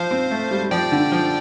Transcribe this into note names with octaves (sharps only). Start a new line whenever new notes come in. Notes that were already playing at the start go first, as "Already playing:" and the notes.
Already playing: F3 C5 F5
C4
A3
G3
G3
F3 D5 G5
D3
F3